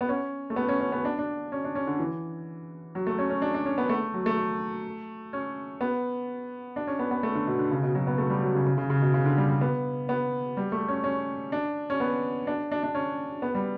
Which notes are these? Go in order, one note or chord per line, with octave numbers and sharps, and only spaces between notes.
B3
C#4
A3
B3
C#4
C#4
B3
D4
D4
C#4
D4
C#4
D3
E3
F#3
A3
C#4
C#4
D4
D4
C#4
B3
A3
F#3
A3
C#4
B3
D4
C#4
B3
B3
A3
D3
B2
D3
C#3
B2
F#3
B3
A3
G3
F#3
C#3
C#3
C#3
C#3
B2
C#3
D3
G3
G3
B3
B3
G3
A3
C#4
C#4
D4
C#4
B3
D4
D4
D4
C#4
B3
G3